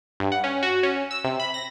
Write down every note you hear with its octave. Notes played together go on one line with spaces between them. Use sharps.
G2
F#5
C#4
F#4
C#4
E6
C3
B5
A#6